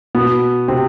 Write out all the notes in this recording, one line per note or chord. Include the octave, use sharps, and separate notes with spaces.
B2 B3
C3 C4